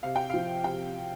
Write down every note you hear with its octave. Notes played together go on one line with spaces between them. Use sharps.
C3 F5
G5
F3 F5
C3 G5